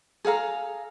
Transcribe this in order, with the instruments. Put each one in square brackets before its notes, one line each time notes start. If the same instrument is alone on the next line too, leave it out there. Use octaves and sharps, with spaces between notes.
[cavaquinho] G#4 A4 F5 A#5